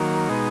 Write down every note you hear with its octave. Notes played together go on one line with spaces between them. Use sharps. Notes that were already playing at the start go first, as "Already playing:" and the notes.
Already playing: D#3 F#3 A#3
B2 G#3 D#4